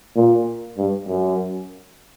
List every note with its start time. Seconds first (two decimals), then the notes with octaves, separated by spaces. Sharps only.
0.16 A#2
0.77 G2
1.08 F#2